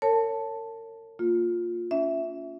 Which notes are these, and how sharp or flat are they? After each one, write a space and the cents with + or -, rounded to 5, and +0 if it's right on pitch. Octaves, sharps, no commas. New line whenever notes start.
A#4 -45 C#5 +0 A5 +0
A#3 -10 F4 +10
C#4 +40 E5 +0